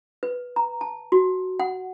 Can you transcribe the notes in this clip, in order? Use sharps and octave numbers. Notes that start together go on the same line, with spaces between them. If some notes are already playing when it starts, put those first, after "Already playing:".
B4
A#5
A5
F#4
F#5